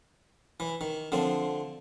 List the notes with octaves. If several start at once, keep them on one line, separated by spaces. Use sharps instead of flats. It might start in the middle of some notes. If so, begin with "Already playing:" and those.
E3
D#3
D3 F3 C4